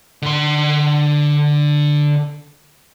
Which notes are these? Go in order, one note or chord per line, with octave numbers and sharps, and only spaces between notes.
D3 C6